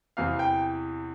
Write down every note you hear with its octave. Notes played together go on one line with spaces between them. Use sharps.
E2 C3 E3 F5
G5